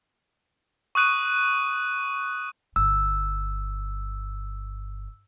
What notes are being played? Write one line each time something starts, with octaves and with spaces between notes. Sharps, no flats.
C#6 D#6 F#6 D#7
G1 E6